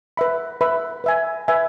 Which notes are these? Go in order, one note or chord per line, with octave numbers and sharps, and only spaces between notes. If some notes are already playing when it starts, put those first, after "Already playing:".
B4 E5 B5
B4 E5 B5
B4 E5 G#5
B4 E5 G#5